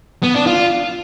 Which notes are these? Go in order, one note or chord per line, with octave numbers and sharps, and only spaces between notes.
B3
D4
F4